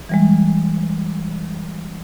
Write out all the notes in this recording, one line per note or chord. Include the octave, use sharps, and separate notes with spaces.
E3 G3 G#3